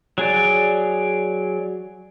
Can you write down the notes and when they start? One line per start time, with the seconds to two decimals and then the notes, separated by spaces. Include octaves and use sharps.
0.18 F#3 G#4 D5